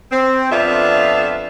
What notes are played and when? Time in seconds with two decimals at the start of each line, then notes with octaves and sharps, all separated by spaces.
0.11 C4
0.51 F2 B3 D4 F4 E5